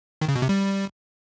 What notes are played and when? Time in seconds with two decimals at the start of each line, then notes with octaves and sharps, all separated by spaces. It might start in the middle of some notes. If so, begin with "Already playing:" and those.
0.21 D#3
0.28 C#3
0.35 B2
0.42 C3
0.49 G3